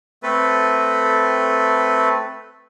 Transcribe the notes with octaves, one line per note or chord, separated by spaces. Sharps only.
A3 C4 A4 B4